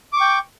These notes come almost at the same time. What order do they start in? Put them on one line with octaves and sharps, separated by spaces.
D6 C#6 G5